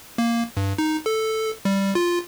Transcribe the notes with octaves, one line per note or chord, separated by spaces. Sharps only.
A#3
G2
D#4
A4
G3
F4